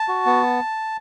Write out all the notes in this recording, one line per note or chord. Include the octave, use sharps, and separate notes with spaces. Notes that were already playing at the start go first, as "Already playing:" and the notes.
Already playing: A5
F#4
B3